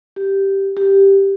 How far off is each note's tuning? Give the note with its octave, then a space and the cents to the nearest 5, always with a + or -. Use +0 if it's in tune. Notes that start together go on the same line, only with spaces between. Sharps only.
G4 -5
G4 +0